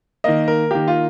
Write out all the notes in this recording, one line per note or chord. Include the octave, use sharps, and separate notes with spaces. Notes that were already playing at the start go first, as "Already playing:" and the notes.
D#3 A#3 D#5
A#4
D#3 A#3 G4
F4